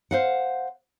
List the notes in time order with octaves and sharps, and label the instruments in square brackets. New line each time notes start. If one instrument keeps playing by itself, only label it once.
[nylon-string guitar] C5 F5 F#5